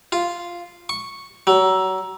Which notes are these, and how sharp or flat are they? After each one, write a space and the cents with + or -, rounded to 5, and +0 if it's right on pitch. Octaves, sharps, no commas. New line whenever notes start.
F4 -5
C#6 -5
F#3 +30